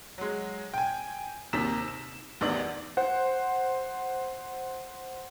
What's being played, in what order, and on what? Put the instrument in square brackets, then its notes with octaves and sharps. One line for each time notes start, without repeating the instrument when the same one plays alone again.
[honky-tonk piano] F#3 G#3
G5 G#5
D#2 C3 D#3 A#5 B6 E7
E7
A1 E2 D#3 B3 D5 F#7
[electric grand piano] C5 F#5